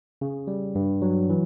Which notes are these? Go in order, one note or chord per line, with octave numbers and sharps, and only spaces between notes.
C#3
G3
G2
F#3
E3